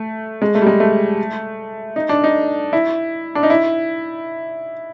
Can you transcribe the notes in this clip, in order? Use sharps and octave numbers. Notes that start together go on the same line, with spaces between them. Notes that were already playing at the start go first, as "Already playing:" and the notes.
Already playing: A3
G#3
A3
G3
G#3
A3
D#4
D4
D#4
E4
D4
D#4
E4